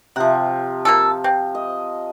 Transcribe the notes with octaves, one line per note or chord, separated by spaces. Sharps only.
C3 F3 F#5
A#3 F4 A4
C4
D#5